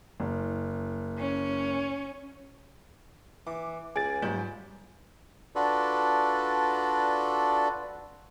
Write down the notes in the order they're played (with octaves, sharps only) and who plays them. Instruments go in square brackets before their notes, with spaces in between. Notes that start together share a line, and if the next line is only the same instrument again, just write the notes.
[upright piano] F#1
[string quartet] C#4
[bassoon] E3 [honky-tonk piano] D6
[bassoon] C#2 [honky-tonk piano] G#4 D7 [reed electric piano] G#5 A6
[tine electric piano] G#2 F#3 F4 [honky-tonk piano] G3 G6
[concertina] D4 F4 F#4 A4 B4 D5